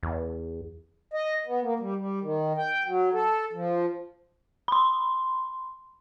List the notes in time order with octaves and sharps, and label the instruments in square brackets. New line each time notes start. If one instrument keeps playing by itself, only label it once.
[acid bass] E2
[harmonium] D#5
B3
A#3
G3
G3
D#3
G5
F#3
A4
F3
[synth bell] B5 C6